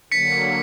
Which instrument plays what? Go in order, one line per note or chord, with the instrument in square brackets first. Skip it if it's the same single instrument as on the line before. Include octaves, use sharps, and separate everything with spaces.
[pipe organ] D3 F#3 A#3 [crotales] B6 C#7